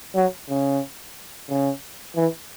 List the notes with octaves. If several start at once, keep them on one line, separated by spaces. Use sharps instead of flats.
F#3
C#3
C#3
E3